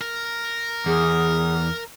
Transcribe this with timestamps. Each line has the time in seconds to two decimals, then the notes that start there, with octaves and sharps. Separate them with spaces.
0.01 A#4
0.86 E2 G#4